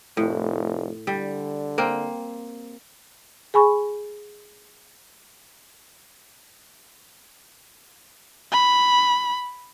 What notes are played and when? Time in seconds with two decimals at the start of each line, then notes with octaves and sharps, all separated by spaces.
0.17 F1 A2
1.07 D3 G3
1.78 A#3 C4
3.54 G#4 G#5 B5 C#6
8.52 B5